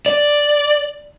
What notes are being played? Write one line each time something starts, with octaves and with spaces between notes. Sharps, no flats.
D5